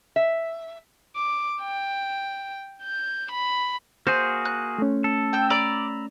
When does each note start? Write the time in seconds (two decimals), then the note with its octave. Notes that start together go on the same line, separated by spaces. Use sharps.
0.16 E5
1.16 D6
1.62 G5
2.83 G6
3.31 B5
4.07 A#3 F#4 G#4 C5
4.45 F#6
4.78 A3 C#4
5.04 A4
5.33 G5 E6
5.50 D5 A#5 B5 E6